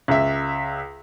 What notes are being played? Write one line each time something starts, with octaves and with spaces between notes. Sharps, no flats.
C#2 E5